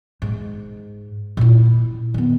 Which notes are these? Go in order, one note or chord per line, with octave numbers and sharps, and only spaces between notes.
G#2
A#2 E4
D#3 B3